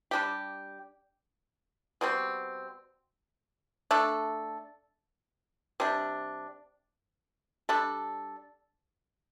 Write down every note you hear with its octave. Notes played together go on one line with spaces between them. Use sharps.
G3 D4 G4
B2 G3 C4
A3 D4 A4
C3 G3 D4
G3 D4 A4